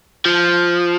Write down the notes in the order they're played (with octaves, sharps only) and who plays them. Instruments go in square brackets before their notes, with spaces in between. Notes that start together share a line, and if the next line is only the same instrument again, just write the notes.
[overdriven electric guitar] F3